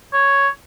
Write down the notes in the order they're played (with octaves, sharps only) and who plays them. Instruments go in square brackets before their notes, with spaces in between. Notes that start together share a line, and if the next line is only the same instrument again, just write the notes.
[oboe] C#5